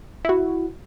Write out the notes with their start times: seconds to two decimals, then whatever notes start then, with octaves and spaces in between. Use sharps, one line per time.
0.25 E4 F#4